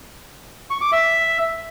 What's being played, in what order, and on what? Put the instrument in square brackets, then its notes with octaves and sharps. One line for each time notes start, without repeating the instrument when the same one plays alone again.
[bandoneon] C#6
D6
E5